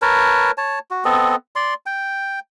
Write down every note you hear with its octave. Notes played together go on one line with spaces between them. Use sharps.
A#4 B4 C#5 A5
C#5 A5
F#4
B3 C4 A4 D#5
D5 C6
G5